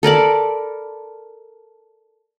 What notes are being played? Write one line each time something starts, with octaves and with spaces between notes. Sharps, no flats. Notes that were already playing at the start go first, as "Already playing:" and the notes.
A4 A#4 D5 B5